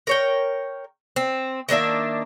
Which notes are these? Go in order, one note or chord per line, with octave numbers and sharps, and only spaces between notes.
A#4 C#5 G5
C4
D#3 A#3 D4 E5